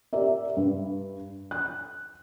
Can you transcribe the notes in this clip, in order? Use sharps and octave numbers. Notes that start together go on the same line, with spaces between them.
G4 A#4 D5 E5
G2
F#6